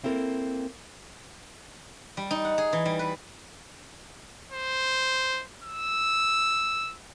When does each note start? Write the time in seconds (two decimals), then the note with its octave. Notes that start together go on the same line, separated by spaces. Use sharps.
0.04 A#3 C4 E4 A4 A#4
2.17 G3
2.31 D#4
2.45 F#5
2.58 G#4
2.73 E3
2.85 G3
2.99 B4
4.52 C5
5.64 E6